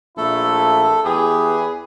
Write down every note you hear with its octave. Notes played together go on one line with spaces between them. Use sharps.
A#1 A3 E4 A4
E2 G4 G#4 B4